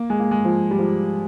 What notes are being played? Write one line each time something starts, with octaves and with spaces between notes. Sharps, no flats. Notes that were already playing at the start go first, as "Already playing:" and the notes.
Already playing: A#3
G#3
A#3
G#3
F3
G3
F3